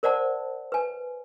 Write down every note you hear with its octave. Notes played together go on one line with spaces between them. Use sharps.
A#4 C5 D5 F#5 A5
B4 G#5